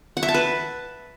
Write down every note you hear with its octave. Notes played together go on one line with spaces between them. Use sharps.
F#5
E5
A5
B4